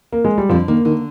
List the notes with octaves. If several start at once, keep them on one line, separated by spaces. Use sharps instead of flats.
A#3
G#3
G3
F2 D3 F3
D#3 A#3
D3 D#3